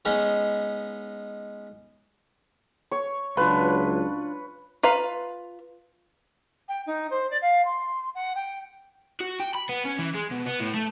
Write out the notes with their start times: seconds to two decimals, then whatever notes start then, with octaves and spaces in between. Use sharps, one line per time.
0.05 G#3 B3 C#4 D#4
2.91 C#5
3.37 C#2 F#3 D4 F4 B4
4.83 F4 B4 F5 A#5
6.68 G5
6.86 D#4
7.10 C5
7.30 D5
7.41 F5
7.64 C6
8.14 F#5
8.35 G5
9.21 F#4
9.40 G5
9.55 B5
9.69 B3
9.85 C#4
9.99 E3
10.15 G#3
10.32 B2
10.47 B3
10.60 A2
10.75 A3